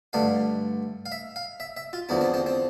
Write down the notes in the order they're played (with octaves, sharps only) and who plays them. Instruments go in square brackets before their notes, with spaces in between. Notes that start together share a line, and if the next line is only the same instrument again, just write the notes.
[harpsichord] G2 D3 A3 F5
F5
E5
F5
E5
E5
F4
E2 D3 F3 E4
C4
C4
C4